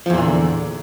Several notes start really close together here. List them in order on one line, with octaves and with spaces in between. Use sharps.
F3 E2 A#2 E3 D3